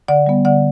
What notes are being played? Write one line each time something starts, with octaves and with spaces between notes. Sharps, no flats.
D3 D5 F#5
G3 B3
D3 D5 F#5